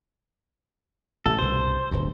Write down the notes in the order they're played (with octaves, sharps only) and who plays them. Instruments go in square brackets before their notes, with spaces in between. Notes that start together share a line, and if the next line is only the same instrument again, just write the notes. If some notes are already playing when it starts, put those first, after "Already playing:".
[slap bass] A1 C3 A3 [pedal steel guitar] A4
[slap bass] C2 G2 B2 [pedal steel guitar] C5
[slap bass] D1 G1 D2